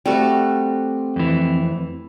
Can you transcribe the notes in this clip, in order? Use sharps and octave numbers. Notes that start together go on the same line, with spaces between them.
G3 A3 C4 F#4
F2 E3